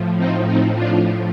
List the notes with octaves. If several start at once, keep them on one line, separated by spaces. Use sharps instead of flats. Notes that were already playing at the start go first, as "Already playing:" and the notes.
Already playing: A2 F3
C4 D#4
C4 D#4
D4 F4